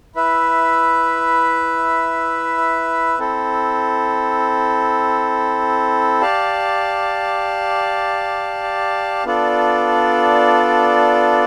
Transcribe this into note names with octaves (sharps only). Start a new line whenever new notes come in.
E4 B4 E5
C4 E4 A4
G4 D5 F5 A5
B3 D4 F4 A4 D5